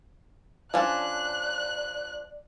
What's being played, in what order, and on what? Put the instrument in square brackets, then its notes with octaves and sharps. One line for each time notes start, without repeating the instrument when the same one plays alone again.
[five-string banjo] F3 C#4 D4 [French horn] D5 [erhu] F#6